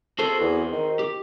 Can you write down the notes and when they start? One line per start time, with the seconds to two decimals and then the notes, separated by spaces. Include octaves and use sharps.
0.19 F#4 G#4 A4 C5
0.40 E2
0.72 D#3
0.99 G4